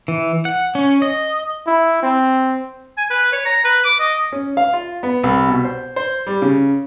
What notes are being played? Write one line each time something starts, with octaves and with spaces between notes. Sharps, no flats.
E3
F#5
C#4
D#5
E4
C4
G#5
B4
C#5
A#5
B4
D6
D#5
C#4
F5
F4
B3
C2
B2
C5
C5
G3
C#3